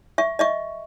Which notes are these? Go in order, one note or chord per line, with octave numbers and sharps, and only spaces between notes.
E5 C#6
D#5 E5 C#6